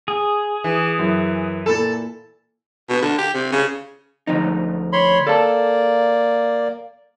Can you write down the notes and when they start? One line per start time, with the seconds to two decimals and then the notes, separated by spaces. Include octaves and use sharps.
0.08 G#4
0.64 E3
0.99 F#2 E4
1.66 A#2 A4 B5 E6
2.90 B2
3.02 D3
3.18 G4
3.34 C3
3.52 C#3
4.27 D2 F3 D#4
4.93 C#5 B5 C6
5.27 A#3 A4 D5 A5